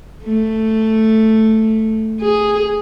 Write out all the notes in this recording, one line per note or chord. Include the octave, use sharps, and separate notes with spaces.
A3
G#4